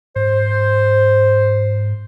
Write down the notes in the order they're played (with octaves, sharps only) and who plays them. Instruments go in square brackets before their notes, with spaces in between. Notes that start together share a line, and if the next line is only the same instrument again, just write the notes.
[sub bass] G#2 [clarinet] C5